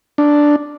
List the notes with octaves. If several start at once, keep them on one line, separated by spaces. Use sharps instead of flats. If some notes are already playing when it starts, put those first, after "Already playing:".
D4